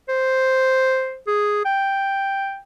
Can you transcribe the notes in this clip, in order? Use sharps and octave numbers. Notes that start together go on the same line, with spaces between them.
C5
G#4
G5